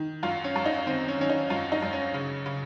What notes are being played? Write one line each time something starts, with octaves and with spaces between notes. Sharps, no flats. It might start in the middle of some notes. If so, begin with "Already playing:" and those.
Already playing: D#3
F#2 F4
C#4
F#2
D#4
D#3 C4
C#4
D#3 C#4
D#4
F#2 F4
D#4
F#2
C#4
C#3
C#3